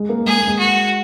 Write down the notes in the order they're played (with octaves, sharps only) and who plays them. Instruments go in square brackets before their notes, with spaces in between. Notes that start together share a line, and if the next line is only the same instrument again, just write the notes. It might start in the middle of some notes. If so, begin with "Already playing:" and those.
Already playing: [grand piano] G#3
A#3
[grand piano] G#3 [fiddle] G#4
[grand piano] A#3
G#3
[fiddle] F#4